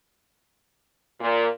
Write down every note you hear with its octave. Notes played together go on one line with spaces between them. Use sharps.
A#2